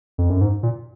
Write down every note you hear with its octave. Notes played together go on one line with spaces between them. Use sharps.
F2
F#2
G#2
A#2